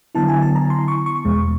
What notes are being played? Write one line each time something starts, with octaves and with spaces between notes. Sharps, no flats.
D3 F#3 B3 E4 A5
G#5
A5
A#5
C6
C#6
C#6
E2 B2 G#3